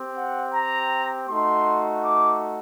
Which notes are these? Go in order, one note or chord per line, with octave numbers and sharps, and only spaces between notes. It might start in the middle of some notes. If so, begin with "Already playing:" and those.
Already playing: C4 G4
F#5
A#5
A3 D#4 F#4 C6
D6